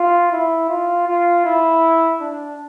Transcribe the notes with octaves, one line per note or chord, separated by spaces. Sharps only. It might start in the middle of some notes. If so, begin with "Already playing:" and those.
Already playing: F4
E4
F4
F4
E4
D4